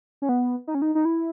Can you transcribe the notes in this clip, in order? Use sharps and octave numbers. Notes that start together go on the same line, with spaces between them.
C#4
B3
D#4
C#4
D#4
D#4
E4